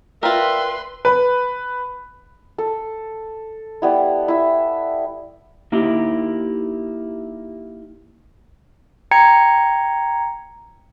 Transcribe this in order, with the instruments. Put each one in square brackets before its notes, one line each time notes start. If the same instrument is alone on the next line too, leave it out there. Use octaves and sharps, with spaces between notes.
[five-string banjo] F4 A#4 [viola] B4 C6 [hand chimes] D5 G5 [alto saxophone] E5
[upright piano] B4
[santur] A4
G3 B3 E4
E4 E5
[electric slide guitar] A#3 D#4 E4 G4
[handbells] G5 A#5 G#6 C#7